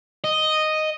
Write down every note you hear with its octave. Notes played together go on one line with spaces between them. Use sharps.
D#5